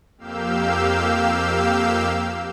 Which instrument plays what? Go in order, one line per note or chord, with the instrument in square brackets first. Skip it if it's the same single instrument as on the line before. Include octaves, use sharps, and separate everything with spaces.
[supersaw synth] F2 A#3 G4 F5 E6 G6